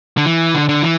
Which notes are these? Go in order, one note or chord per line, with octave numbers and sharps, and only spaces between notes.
D3
E3
D3
D3
E3